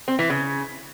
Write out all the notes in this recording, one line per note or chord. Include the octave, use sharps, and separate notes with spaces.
C4
E3
C#3